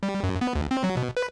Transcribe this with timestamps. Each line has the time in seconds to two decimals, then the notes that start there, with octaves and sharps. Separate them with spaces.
0.03 G3
0.23 F#2
0.41 B3
0.55 D2
0.71 C4
0.84 F#3
0.97 B2
1.17 B4